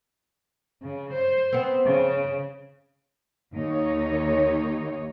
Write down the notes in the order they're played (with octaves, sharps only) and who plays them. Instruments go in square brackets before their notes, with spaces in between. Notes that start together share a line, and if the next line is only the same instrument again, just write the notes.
[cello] C#3
C5
[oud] B3 C4
[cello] C#3
[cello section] D#2 D#4 C#5